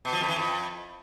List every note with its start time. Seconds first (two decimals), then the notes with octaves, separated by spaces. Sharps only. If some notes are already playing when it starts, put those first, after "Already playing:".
0.05 B2
0.13 F3
0.21 F2
0.28 E3
0.36 F2